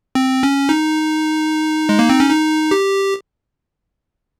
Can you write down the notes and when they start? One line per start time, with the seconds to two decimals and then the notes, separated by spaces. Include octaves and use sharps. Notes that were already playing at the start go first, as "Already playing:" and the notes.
0.15 C4
0.43 C#4
0.69 D#4
1.89 G#3
1.99 A#3
2.09 C4
2.20 C#4
2.30 D#4
2.71 G4